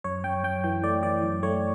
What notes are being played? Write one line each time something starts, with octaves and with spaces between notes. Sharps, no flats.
F#2 C#5
F#2 G5
F#2 G5
E3 G5
A3 D5
E3 D5
F#2
A3 C#5